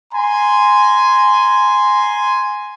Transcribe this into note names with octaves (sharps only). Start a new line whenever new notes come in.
G#5 A#5 C6